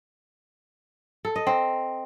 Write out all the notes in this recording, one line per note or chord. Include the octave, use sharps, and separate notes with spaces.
A4
D#5
C4